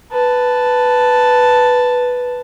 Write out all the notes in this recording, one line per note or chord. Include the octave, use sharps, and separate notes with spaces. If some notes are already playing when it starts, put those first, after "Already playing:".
B4 A5